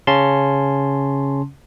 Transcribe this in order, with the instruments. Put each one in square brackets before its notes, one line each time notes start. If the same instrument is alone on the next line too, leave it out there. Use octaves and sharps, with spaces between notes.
[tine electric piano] C#3 C#4 A5 C6